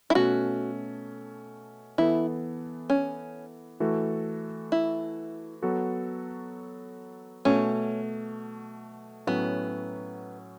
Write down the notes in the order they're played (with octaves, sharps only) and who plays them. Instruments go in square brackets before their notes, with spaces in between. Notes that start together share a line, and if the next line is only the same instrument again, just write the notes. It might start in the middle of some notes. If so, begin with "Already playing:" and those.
[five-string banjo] E4
[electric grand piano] B2 A3 C#4 A4 [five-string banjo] F#4
[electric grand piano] E3 B3 A4 [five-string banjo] E4
[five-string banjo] C#4
[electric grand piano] E3 A3 F#4 A4
[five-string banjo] E4
[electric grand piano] F#3 B3 F#4 A4
[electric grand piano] B2 A3 F#4 [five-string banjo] C#4
[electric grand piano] A2 F#3 C#4 [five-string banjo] B3